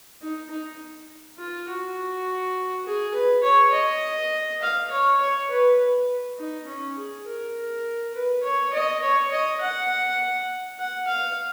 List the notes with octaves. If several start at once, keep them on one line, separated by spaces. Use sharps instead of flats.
D#4
D#4
F4
F#4
G#4
B4
C#5
D#5
F5
C#5
C#5
B4
B4
D#4
C#4
G#4
A#4
B4
C#5
D#5
C#5
D#5
F#5
F#5
F5